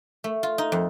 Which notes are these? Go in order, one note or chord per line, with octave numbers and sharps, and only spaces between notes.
A3
F4
D#4
F2